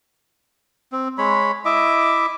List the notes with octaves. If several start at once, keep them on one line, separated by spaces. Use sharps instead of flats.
C4
G#3 C#5 B5
E4 D#5 E5 D6